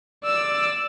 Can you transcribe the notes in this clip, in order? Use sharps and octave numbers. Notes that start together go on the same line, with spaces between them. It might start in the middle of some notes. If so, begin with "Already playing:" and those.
D5 E6